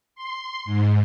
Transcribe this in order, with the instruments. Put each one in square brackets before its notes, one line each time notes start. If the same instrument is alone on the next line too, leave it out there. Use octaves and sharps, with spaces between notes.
[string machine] C6
G#2